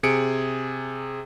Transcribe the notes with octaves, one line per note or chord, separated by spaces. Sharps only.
C3 G#4 C#7 D7